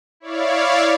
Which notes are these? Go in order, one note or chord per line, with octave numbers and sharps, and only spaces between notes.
E4 C#5 D5 F5